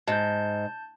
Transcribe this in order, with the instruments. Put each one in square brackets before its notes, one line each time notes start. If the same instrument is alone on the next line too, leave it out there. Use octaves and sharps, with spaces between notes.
[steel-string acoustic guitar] G#2 [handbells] A5 G6